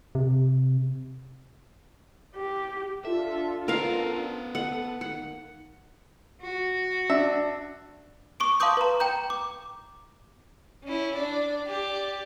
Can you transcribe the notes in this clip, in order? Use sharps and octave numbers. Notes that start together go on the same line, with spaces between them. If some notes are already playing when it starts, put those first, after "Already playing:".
C3
G4
D4 F4 A4 E5
B3 A#4 C5 F5
A4 F#5
D#3 A#3 F#5
F#4
D4 E5
C#6 D6 D7
F5 A5 C6 D6 D#6 G6
B4 A#5
G5 A#5 G6
D6
C#4 E4
D4 D5
G4 D5